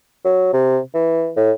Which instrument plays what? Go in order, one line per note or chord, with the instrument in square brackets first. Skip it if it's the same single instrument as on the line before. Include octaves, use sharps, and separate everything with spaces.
[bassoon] F#3
C3
E3
A2